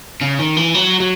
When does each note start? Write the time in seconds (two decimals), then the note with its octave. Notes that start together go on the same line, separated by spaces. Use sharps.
0.21 C#3
0.39 D#3
0.57 E3
0.74 F#3
1.00 F#3